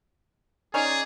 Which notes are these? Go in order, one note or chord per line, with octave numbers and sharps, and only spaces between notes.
C#4 D#4 G#4 D5